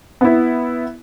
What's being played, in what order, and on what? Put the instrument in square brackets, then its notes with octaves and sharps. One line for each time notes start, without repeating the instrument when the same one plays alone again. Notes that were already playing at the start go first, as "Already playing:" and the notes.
[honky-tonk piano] B3 E4